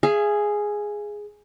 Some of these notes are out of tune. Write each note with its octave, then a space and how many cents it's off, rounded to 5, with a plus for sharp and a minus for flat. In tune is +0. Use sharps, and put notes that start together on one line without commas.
G#4 +0 E5 +45